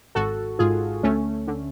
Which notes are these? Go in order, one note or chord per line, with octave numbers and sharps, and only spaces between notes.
G#1 F#4 A4
G#2 F4 G#4
D2 A3 C#4
D3